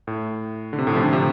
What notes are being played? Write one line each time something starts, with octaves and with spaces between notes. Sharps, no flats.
A2
D3
C3
A2 D3
C3 F3
A2 D3
C3 F3